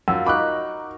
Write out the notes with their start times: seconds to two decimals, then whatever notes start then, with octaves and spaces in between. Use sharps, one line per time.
0.08 F#2 F4 F5 E6
0.26 D#4 F#4 A#4 B5 D6 F#6